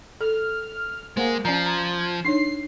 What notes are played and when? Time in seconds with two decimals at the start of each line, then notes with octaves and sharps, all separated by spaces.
0.21 A4 F6
1.17 G#3 A#3 C5 F#5
1.45 F3 C#4 D5 A#5 C7
1.66 A#5 G#6
2.25 D4 D#4 C#5 C7